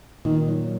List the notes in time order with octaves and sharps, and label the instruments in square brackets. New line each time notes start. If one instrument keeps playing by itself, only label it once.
[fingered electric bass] A#2 [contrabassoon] D#3
[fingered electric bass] F#3